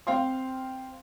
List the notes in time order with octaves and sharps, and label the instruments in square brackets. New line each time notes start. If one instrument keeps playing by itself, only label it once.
[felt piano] C4 F5 G5 C6